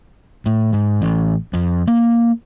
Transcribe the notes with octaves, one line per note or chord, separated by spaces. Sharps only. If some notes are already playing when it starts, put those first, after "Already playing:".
A2
G#2
A1
F2
A#3